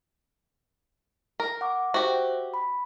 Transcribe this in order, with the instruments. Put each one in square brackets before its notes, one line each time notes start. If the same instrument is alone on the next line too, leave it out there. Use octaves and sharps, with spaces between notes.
[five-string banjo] A#4
[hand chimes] F#5 C#6 D6
[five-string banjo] F#4 G4 [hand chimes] C5 E5
[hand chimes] B5